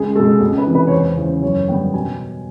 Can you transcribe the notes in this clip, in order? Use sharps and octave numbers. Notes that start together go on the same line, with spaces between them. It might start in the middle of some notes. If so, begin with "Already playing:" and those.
Already playing: C#2 G#4
B2 G#3 A4
C#2
B4
C3 E3
B4
C#5
E2 C5
C5
C#3 E3
C5
F#2 C#5
D3 G3 B3 G5
B2 G#5